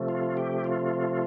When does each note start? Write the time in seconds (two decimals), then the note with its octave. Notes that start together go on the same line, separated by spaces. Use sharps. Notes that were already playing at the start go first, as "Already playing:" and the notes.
Already playing: C3 F3 A3
0.09 F4
0.37 G4
0.64 F4